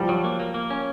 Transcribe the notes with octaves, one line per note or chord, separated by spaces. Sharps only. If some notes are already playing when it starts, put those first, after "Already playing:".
Already playing: F3 G3
F#3
A#3
A#3
A#3
C#4